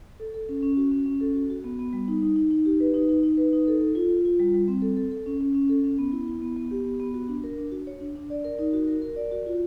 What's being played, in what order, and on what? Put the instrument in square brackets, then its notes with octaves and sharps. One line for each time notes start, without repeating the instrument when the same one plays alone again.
[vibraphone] A4
A4
C#4
C#4
F#4
C#4
C#4
A4
F#4
F#4
B3
B3
G3
D#4
D#4
D#4
D#4
G4
B4
D#4
D#4
D#4
B4
D#4
A4
A4
F4
F4
F4
G3
G3
C4
A4
A4
A4
C#4
C#4
C#4
A4
C#4
B3
E4
E4
B3
B3
G4
B3
B3
F#4
D4
A#4
D4
F#4
C#5
D4
D4
D5
A#4
D#4
F#4
A#4
A#4
D5
F#4
F4